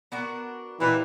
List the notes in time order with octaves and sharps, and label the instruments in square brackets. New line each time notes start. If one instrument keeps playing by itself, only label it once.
[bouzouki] B3 D4 F#4 A#4
[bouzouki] A#2 G3 C4 D#4 [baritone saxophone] E3